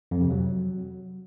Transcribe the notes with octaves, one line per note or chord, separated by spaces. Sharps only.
F2
C3
F#3